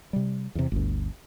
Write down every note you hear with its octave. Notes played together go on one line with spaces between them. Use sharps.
C3 G3
E2 C3
G1 D2